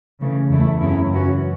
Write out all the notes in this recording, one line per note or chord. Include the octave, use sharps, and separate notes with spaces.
C#3 E3 A3
E2 C#3 A3 E4
F#2 C#3 F#3 C#4 E4
F#2 E3 C#4 F#4